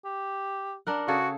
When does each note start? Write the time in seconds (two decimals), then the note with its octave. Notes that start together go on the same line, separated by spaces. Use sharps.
0.05 G4
0.87 D4 A#4 F#5
1.08 C#3 F#4 G#4 A4